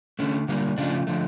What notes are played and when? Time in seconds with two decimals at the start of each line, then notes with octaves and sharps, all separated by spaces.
0.19 D3 A3 C#4
0.48 D3 G3 A#3
0.78 C#3 F3 A3 D4
1.07 D3 F3 A3